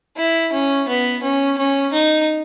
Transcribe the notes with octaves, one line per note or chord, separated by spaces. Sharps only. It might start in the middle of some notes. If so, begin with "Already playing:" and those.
E4
C#4
B3
C#4
C#4
D#4